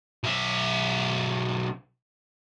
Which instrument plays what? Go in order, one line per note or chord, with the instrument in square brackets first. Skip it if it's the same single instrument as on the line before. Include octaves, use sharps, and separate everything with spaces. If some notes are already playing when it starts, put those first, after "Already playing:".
[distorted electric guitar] B1 E5